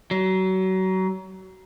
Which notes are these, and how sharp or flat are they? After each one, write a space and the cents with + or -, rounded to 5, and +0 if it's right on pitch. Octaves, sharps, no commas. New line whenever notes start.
F#3 +30